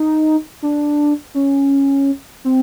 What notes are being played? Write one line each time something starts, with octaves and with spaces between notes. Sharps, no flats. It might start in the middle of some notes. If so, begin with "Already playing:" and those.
Already playing: D#4
D4
C#4
C4